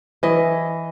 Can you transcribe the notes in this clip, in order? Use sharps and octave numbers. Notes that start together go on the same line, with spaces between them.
E3 D#5